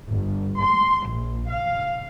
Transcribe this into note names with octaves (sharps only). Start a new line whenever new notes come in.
G1
C6
A#1
F5